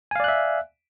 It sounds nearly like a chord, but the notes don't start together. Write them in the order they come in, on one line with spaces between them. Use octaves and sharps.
G#5 F5 D5 F#6 E5